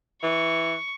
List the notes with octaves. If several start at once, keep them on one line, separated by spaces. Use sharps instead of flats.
E3 C#6